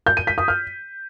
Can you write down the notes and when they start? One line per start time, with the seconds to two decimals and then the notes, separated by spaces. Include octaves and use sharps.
0.06 G6
0.17 D#7
0.27 B6
0.38 D#6
0.48 F6